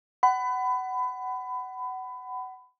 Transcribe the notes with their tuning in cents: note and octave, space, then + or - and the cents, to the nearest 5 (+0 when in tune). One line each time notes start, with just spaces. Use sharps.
F#5 +25 B5 +25